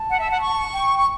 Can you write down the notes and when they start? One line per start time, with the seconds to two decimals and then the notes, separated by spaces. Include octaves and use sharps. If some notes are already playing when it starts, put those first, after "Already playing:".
Already playing: A5
0.10 F#5
0.20 E5
0.31 F#5
0.42 C#6
0.73 G5
0.98 C#6